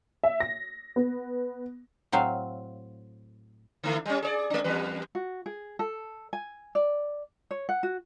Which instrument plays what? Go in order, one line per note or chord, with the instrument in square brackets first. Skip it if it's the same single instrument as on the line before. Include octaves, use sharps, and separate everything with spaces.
[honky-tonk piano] E5
A#6
B3
[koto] A2 F#3 C4 F5
[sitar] D3 A3 E4
G3 C#4
G#4 C#5 D5
G#3 D4
E2 G3 B4
[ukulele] F#4
G#4
A4
G#5
D5
C#5
F#5
F#4